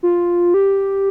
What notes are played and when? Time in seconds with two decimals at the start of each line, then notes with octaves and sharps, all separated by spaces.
0.03 F4
0.54 G4